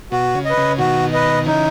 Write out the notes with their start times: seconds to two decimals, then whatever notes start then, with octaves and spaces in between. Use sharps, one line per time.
0.12 B2 F#4
0.35 C#3
0.45 B4 D#5
0.57 C#3
0.79 B2 D#3 F#4
1.13 B4 D#5
1.46 C#3 E3 D#4